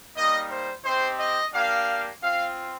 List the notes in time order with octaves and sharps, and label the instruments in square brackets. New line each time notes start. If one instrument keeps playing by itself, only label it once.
[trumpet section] G3 A#3 D#4 D#5
C5
C4 D#4 G4 C5
D#5
A#3 D4 G4 F5
C4 F4 F5